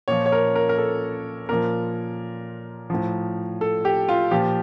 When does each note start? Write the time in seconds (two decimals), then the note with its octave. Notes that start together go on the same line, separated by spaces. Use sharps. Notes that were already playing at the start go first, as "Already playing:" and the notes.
0.08 A#2 F3 C#5
0.26 C#5
0.32 A#4
0.55 A#4
0.69 A#4
0.78 A4
1.49 A#2 F3 A#4
2.90 A2 F3
3.61 A4
3.85 G4
4.09 F4
4.31 A#2 F3 G4